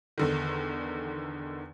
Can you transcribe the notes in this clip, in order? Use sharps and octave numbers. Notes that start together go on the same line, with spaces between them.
E2 D3 D#3